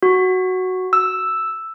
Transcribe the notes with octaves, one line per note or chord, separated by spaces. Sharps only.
F#4
E6